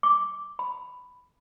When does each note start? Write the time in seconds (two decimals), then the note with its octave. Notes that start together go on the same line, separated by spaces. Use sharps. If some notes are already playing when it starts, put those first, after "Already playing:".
0.03 D6
0.59 B5